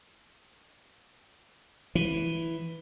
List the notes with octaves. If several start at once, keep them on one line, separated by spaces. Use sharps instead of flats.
E3